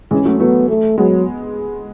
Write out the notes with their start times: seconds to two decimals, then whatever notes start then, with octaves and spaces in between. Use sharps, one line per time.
0.11 E3 G#3 C#4
0.25 F#3 A3
0.40 F#3 A3 B3
0.69 A3
0.98 F#3 G#3 B3